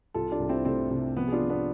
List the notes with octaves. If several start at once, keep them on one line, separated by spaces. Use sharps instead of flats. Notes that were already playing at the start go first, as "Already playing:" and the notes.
C2 F4 A4
D4 F4
C2
C4 E4
C3 A3 C4
C3
F3 B3
G#4
D4 F4
F3
B3 D4